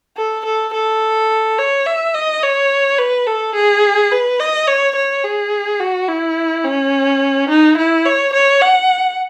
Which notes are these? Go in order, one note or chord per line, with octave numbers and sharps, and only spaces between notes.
A4
A4
A4
C#5
E5
D#5
C#5
B4
A4
G#4
B4
D#5
C#5
C#5
G#4
F#4
E4
C#4
D#4
E4
C#5
C#5
F#5